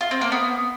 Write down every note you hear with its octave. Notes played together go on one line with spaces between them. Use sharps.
F4
C4
A#3
B3